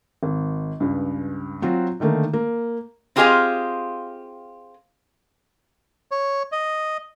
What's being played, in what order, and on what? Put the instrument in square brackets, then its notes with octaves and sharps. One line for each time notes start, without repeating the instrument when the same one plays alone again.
[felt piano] G#1
C#2 G2
F#3 C4 F4 F#4
D3 D#3 A3 A#3
A#3
[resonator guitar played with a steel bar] C4 F4 G4 G#4 D#5 F5
[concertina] C#5
D#5